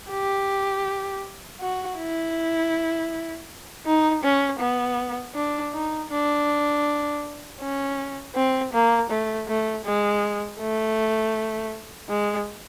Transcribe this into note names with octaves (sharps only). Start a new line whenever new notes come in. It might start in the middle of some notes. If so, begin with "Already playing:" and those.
G4
F#4
E4
D#4
C#4
B3
D4
D#4
D4
C#4
C4
A#3
A3
A3
G#3
A3
G#3